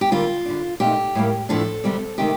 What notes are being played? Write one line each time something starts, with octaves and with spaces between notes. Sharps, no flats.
G4
D2 D3 G3 A#3 F4
D3 G3 D4
A#2 A3 C4 D#4 G4
A2 G3 A#3
A2 F3 A3 D4 A4
D2 C3 G3 C4
C3 D#3 A3 G4